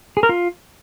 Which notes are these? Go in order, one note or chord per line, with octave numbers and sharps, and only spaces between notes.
G#4
A#4
F4